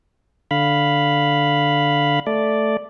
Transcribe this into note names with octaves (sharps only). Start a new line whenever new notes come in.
D3 F5 B5
A3 D5